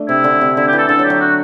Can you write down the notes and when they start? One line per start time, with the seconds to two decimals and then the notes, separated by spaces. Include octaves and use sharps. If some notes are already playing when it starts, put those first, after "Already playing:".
Already playing: A3 D4
0.09 C3 E4
0.24 D3
0.41 C3
0.57 D3 E4
0.68 G4
0.73 E3 A4
0.89 D3 A4
0.99 F#3
1.04 G4
1.10 F#3
1.21 F#4